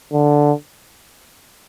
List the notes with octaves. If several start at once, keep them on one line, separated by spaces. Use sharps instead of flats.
D3